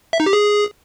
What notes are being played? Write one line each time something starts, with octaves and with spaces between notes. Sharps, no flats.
E5
D#4
G4
G#4